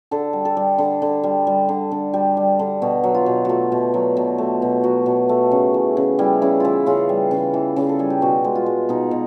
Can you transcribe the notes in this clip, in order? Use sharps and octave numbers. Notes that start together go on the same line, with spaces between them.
D3 A4
G3
A4
G3
D3
D3
G3
G3
D3
D3
G3 G4
G3
D3
B2 F#4
F#3
F4
B2
A3 F4 F#4
B2
F#3
B2
A3
B2
F#3 F#4
B2
A3
C#3
E3
C#3
G3 E4
C#3 E4
E3 E4 F4
C#3 F4
G3
C#3
E3
C#3
A4
G3 G#4
G4
B2 F#4
G#3
F4
G#3
B2 D#4
B2